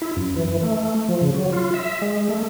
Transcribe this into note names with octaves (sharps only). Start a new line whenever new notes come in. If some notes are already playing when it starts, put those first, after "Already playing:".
E4
F#2
E3
A3
F3
C#3
F#3
F4
E5
G#3
A3